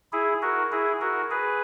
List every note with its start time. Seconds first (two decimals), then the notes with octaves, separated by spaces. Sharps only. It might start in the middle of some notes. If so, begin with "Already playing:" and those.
0.13 E4 G#4
0.42 F#4 A#4
0.72 E4 G#4
1.01 F#4 A#4
1.31 G#4 B4